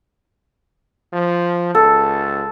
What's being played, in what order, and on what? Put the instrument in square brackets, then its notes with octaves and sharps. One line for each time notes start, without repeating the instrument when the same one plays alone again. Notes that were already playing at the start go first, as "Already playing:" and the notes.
[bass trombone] F3
[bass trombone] C#2 [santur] A4